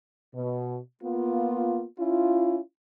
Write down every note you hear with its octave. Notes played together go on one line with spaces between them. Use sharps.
B2
A#3 B3 F4
C#4 E4 F4